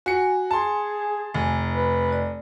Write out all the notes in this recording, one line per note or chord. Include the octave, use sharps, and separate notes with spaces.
F#4 G#5 C#7
G#4 A5 C6
F1
B4
D5